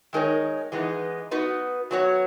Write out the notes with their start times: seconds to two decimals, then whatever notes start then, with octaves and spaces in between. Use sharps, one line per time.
0.13 D#3 G#3 D#4 A#4 C#5
0.72 E3 G#3 B3 D#4
1.31 B3 D#4 F#4 B4
1.91 F#3 B3 F#4 C#5